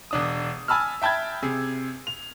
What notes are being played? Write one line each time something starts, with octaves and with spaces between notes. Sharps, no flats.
E1 D4 D#6
G#5 A5 B5 E6 F6
E5 G5 A5 B5 G#6
C3 G#4
F7